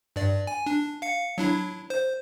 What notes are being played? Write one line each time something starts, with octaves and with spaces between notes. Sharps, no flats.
G2 D5
G#5
D4
F5 C#7
F#3 D4 E4
C5